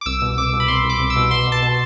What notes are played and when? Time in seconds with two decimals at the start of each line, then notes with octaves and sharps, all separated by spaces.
0.01 D6
0.06 C2 E6
0.22 B2
0.37 C2 D6
0.53 B2
0.60 B5
0.68 C2 C6
0.84 C2
0.90 D6
1.00 C2
1.10 E6
1.16 B2
1.31 B2 C6
1.47 B2
1.52 A5
1.62 B2